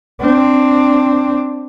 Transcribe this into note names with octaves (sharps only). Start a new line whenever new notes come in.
C4 D4